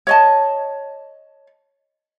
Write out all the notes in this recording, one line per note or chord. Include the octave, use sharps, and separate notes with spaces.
C#5 D#5 A5